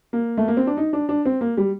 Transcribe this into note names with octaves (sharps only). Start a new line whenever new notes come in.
A#3
A3
A#3
C4
D4
D#4
D4
D4
C4
A#3
G3